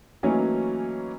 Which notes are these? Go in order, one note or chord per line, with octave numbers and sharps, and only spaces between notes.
E3 F#3 A3 A#3 C#4 D#4